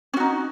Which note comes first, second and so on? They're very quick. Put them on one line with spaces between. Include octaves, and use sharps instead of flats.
C#4 F#4 D#4